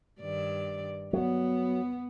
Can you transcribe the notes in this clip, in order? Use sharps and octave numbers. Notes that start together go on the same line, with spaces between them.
G2 D#3 D5
F#3 B3